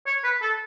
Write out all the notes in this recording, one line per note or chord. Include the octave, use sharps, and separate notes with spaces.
C#5
B4
A4